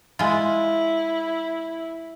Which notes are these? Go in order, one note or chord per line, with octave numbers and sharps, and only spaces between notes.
G#3 E4 F4